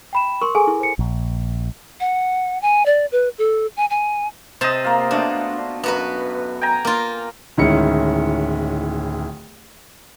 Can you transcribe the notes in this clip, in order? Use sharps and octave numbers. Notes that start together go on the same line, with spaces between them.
G5 B5 E7
A#4 C6 C#6
G#4 A4 G#5
E4
C5 C#7
A#1
F#5
G#5
D5
B4
A4
G#5
G#5
C3 C5 D#5 A5
A#3 F4
B2 A3 D4
F#2 B3 F#4 B4
G5 G#5 A#5
A#3 F4
D1 D#3 G#3 C#4 E4 C#7